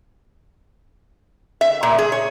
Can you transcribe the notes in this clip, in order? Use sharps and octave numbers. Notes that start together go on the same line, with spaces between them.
E5
A#2
G#4
C#5